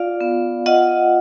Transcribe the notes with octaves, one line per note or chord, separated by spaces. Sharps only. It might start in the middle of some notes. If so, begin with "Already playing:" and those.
Already playing: F4 D5 F5
B3
F4 D#5 F#5